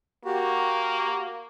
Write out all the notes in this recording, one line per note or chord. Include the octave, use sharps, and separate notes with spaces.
A#3 F#4 G4